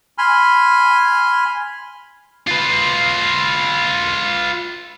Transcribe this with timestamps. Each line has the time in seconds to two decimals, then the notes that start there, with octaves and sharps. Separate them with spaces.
0.18 G#5 B5 C6 F6
2.47 F4 B4